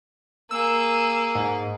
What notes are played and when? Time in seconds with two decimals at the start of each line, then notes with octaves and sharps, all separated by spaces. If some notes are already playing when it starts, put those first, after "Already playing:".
0.51 A#3 G#4 E6
1.35 G#2